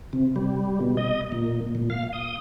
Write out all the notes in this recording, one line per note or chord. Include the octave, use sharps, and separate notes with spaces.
C3
G3
B2
D#5
A#2
A#2
F5
D#6